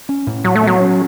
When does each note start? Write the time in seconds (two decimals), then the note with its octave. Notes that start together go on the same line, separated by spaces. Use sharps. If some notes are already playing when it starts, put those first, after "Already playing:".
0.09 C#4
0.27 A2
0.44 A2 F#3
0.56 A3
0.63 F#3 B3
0.80 C#4